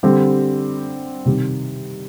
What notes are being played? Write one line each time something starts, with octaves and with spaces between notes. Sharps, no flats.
D3 G3 C4 G4
C3 D#3 G3